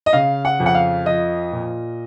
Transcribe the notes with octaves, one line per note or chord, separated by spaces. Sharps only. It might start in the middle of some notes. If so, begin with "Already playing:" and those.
D#5
C#3 F5
F#5
F2
F#5
F5
F3 D#5
A#2